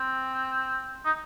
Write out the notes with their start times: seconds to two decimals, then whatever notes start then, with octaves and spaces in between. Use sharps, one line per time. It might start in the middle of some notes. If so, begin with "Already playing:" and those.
Already playing: C4
1.05 D#4